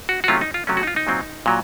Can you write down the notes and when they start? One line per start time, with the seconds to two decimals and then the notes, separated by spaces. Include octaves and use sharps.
0.09 F#4
0.24 F#4
0.28 C3 F#3 A3 C#4 F4
0.41 D#4
0.54 F4
0.67 C3 F#3 A3 C#4
0.77 F#4
0.83 D#4
0.87 F4
0.96 D#4
1.07 A#2 F#3 C4
1.46 A#2 F#3